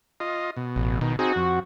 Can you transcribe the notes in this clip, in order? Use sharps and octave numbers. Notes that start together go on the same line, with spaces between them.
F4 D#5
B2
A1
B2 D#3
C4 D#4 F#4 G#4
F2